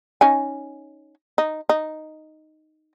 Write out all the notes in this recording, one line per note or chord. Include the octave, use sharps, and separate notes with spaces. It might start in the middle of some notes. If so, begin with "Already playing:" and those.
C#4 D#4 G#5
D#4
D#4